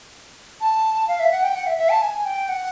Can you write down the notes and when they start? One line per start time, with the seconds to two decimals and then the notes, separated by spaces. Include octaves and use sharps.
0.61 A5
1.08 F5
1.19 E5
1.31 F#5
1.43 G5
1.55 F#5
1.67 E5
1.78 E5
1.89 A5
2.02 G#5
2.25 G5
2.49 F#5